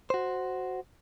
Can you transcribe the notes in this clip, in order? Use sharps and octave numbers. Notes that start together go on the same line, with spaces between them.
F#4 C5